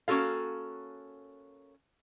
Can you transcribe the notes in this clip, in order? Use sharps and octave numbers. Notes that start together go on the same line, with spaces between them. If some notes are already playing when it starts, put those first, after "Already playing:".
A#3 C#4 F#4 A4 F5